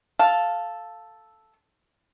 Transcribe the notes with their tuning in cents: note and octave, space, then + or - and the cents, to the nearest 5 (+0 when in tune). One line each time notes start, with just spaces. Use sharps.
A4 +0 F5 +0